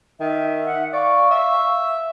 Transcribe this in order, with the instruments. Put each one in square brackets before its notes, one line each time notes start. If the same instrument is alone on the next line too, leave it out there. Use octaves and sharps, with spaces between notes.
[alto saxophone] D#3 [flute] E5
[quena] F#5
[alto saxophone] D5 [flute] F5 [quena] C#6
[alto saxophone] E5